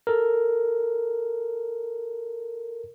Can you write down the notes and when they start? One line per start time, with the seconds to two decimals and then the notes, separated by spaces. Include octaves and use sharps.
0.07 A4 A#4